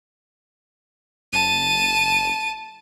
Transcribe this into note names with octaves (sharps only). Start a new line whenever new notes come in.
F#1 A5 D#7